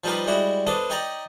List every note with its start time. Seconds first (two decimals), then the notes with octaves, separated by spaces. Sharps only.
0.04 F3 G3 D#4 G4 A#4 B4
0.26 G3 G#3 E4 F#4 C#5
0.67 B3 D4 A4 C5 D#5
0.90 D#4 G4 C#5 D5 A#5